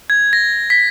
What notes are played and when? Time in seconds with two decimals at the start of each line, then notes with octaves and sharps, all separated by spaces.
0.10 G#6
0.33 A#6
0.70 B6